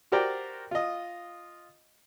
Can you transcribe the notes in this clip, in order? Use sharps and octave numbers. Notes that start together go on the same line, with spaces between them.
F#4 G4 A#4 C5 D5 G5
F4 D#5